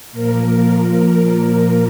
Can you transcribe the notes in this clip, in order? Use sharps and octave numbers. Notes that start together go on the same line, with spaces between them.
A#2 F3 A#3 A#4
A#3 A#4